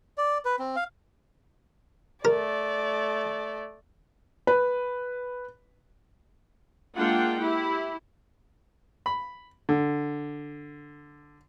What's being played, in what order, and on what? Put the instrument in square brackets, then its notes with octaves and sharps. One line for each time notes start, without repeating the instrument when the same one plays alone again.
[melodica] D5
B4
C4
F5
[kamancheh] A3 D5 [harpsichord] A#4
[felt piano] B4
[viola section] G#3 A#3 D4 F4 F#5 G5
E4 G4
[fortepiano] B5
D3